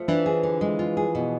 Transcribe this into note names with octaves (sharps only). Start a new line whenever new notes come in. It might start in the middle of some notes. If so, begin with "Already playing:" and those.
Already playing: F3 A3
E3 D4
G#4
D3
G#3
F4
G#4
B2